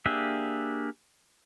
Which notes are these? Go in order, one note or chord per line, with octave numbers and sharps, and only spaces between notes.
A#3 D4 G4 G#4 E5